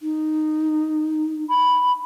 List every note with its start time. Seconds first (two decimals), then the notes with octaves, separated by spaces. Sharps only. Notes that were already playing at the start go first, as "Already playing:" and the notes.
0.01 D#4
1.50 B5